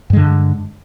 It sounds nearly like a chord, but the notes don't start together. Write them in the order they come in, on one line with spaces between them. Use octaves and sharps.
G2 G#3 D3